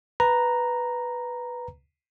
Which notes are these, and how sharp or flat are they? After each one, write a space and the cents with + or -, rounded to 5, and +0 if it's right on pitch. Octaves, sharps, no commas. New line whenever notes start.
B4 +0 A#5 +0